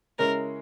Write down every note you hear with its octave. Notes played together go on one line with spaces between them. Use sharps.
C#3 G#3 C#4 E4 A#4